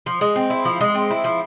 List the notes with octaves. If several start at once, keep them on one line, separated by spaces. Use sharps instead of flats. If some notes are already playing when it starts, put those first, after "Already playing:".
F3
G#3
C4
E4
F3
G#3
C4
E4
F3